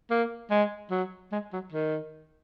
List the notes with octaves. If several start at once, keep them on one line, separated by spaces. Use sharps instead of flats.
A#3
G#3
F#3
G#3
F#3
D#3